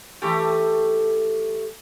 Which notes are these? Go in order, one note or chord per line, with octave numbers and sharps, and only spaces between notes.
E3 A3 G4